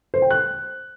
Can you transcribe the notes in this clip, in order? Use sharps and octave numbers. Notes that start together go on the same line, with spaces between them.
C5
G5
F#6